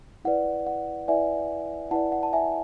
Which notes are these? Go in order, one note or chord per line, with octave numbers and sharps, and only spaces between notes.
E4 B4 D5 F#5
F#5
E4 B4 D5 E5 G#5
E4 B4 D5 F#5 A5
F#5
A5
E5 G#5